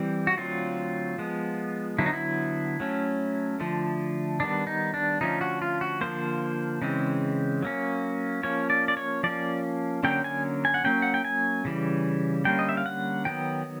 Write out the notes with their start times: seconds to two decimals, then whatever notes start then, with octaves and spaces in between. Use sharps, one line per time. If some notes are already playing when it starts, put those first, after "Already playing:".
Already playing: E3 G3 C4
0.27 F#4
0.37 D3 F#3 A3 C4 F4
1.18 F3 G#3 B3
1.98 D3 F#3 B3 E4
2.06 D#4
2.13 E4
2.80 F#3 A3 C#4
3.60 D3 F3 A3
4.40 D#3 G3 B3 D4
4.67 D#4
4.94 D4
5.21 D3 F3 A3 C#4 D#4
5.41 F#4
5.62 F4
5.81 F#4
6.01 D3 F3 A#3 C5
6.82 C#3 E3 G#3 C4
7.62 F#3 A#3 C#4
8.43 F3 A#3 C#4 C#5
8.70 D5
8.88 D5
8.97 C#5
9.23 F3 A#3 C#4 D5
10.03 D3 F#3 A#3 C#4 G5
10.24 G#5
10.65 G#5
10.74 F#5
10.84 F#3 A#3 C#4 G5
11.02 F#5
11.14 G5
11.25 G#5
11.65 C#3 E3 G3
12.45 D3 G3 A#3 C#4 G5
12.59 D#5
12.69 E5
12.77 F5
12.86 F#5
13.25 D#3 F#3 B3 G5